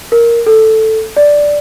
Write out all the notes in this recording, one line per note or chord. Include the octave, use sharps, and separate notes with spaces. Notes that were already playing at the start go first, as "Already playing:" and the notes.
A#4
A4
D5